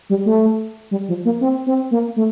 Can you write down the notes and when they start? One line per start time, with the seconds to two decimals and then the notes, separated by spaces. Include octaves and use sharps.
0.10 G3
0.26 A3
0.91 G3
1.08 F3
1.25 A#3
1.41 C4
1.66 C4
1.91 A#3
2.16 A3